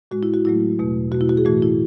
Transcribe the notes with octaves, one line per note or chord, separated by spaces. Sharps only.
A2 G#3 F#4
E4
F#4
A2 F#3 A3 E4
E2 B2 A3
B2 A3 F#4
E4
F#4
G#4
A2 E3 A3 F#4
E4